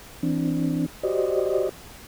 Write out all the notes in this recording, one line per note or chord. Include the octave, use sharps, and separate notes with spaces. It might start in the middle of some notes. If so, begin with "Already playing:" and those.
E3 C4 D4
F#4 G4 C5 D5 D#5